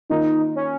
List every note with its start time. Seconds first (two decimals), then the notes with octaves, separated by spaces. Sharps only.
0.10 D#3 A#3 D#4 F4
0.56 C#4